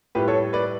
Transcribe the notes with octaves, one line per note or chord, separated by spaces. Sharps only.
A2 G3 G4 B4
A4 C#5
B4 D5